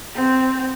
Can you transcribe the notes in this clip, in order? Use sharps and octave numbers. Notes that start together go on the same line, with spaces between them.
C4